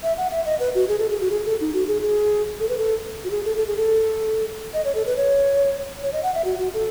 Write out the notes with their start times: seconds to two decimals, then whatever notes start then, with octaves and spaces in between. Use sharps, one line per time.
0.03 E5
0.17 F#5
0.31 E5
0.45 D#5
0.60 B4
0.75 F#4
0.88 G#4
0.99 A4
1.10 G#4
1.21 F#4
1.31 G#4
1.45 A4
1.61 D#4
1.74 F#4
1.88 G#4
2.02 G#4
2.60 A4
2.69 B4
2.78 A4
3.24 F#4
3.31 G#4
3.45 A4
3.56 A4
3.67 G#4
3.77 A4
4.74 D#5
4.85 C#5
4.95 A4
5.06 B4
5.17 C#5
6.03 C#5
6.13 D#5
6.23 F#5
6.35 E5
6.45 F#4
6.59 F#4
6.74 A4